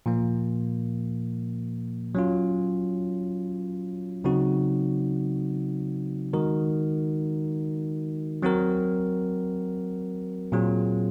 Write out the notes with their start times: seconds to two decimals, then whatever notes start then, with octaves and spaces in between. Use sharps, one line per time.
0.06 A#2 F3 A#3
2.15 F#3 C#4 F4
4.24 C#3 F#3 C4 D#4 F#4
6.33 D#3 G#3 D#4 F#4 A#4
8.42 F#3 C4 F#4 A#4
10.52 A#2 F#3 C4 F4 G#4